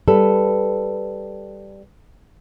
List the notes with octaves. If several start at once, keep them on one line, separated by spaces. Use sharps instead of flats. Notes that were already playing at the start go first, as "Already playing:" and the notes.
G3 A4 B4